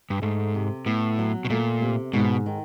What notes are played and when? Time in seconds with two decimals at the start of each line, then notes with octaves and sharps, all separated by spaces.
0.10 G2
0.22 G#2 A3
0.55 C3
0.86 A2 B3
1.19 F#3
1.45 B2
1.50 A#2 A3
1.82 C3
2.13 G#2 B2
2.46 D#3